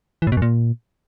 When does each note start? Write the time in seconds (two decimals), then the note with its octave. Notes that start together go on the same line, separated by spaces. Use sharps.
0.22 E3
0.27 A2
0.32 B2
0.37 F#2
0.42 A#2